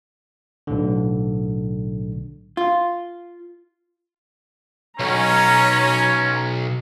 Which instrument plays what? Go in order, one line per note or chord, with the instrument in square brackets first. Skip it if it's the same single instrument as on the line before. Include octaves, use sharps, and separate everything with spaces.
[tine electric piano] B1 A2 D3
[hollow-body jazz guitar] F4
[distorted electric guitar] B1 [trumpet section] C#4 [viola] A#5